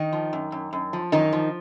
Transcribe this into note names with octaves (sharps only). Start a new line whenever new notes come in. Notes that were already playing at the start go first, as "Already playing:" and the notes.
Already playing: D#3 D#4
F3
F#2
F#2
F#2
F3
F#2 D#3 D#4
F3